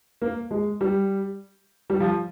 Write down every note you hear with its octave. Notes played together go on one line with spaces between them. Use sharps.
A#3
G#3
G3
G3
F3